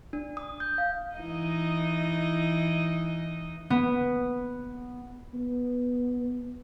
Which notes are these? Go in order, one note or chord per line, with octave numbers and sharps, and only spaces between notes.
D4
D#6
G6
F5
E3 D#4 D#5
B3
B3